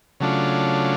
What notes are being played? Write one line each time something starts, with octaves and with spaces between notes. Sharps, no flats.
C#3 F#3 A3 D4 F4